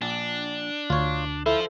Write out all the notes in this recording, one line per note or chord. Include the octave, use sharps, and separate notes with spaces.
A#1 D4
D2 F4 C#5
E4 F4 A4 C5 E5